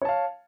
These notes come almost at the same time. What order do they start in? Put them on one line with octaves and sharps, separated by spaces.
C#5 A5 F5